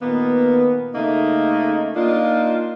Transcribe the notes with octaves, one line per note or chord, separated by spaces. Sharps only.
A#2 D#3 A#3 B3
C#3 A3 A#3 D#4
A#3 D4 D#4 F4